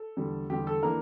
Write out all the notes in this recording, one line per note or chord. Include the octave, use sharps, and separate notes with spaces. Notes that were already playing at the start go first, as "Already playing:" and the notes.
Already playing: A4
E2 D3 G3
E2 D3 G3 G4
A4
E3 A#3 D4 A#4